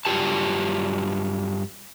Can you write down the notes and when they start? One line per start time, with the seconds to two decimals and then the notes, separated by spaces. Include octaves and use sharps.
0.05 G2 F#3 F4 G4 A5